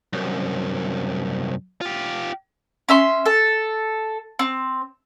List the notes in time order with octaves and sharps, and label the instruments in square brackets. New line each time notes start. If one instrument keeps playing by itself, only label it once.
[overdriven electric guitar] C2 F#2
F4 G4
[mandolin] C#4 E5 C6
A4
C4